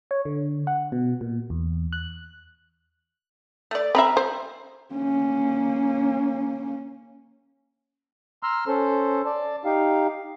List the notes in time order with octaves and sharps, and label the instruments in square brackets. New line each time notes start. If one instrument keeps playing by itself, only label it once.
[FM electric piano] C#5
D3
F#5
B2
A#2
E2
F#6
[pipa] A3 D5
[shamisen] C4 E5 [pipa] F5 A#5 B5
[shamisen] C5
[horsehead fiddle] A#3 C#4
[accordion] A#5 C6 E6 F6
C#4 A4 C5
D5 A5
D#4 G4 F5